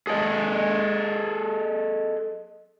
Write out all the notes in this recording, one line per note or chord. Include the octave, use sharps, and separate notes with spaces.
G#4 A4 D#5